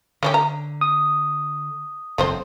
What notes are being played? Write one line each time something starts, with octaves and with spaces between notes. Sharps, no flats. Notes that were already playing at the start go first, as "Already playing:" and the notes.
D3 A3 C#4 G4
A#5
D#6
F#1 E2 A3 C4 C5